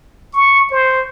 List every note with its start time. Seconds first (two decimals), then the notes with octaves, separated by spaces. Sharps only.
0.33 C#6
0.72 C5